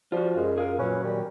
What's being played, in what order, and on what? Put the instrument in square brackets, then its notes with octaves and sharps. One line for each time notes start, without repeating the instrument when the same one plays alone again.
[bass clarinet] F3 [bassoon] G3 [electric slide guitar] F4 F#4
[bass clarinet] F#2 [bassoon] G#3
[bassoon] F4 [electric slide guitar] G#4 A#4
[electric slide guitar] A#2 F#3 [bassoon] C#4 [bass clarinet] B4
[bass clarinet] D#3 [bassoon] G3